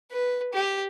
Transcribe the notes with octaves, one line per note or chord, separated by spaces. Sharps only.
B4
G4